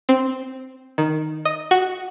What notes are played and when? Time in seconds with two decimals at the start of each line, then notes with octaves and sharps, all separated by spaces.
0.09 C4
0.98 D#3
1.45 D#5
1.71 F#4